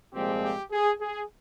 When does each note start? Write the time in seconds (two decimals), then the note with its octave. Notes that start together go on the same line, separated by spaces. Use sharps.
0.14 C2 A#2 F3 G#3 C4 G4
0.42 G4
0.71 G#4
1.01 G#4